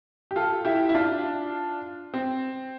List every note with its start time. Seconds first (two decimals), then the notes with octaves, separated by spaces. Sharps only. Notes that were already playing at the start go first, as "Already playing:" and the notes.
0.31 G4
0.36 F4 A4
0.65 E4 G4
0.89 E4
0.95 D4 F4
2.14 C4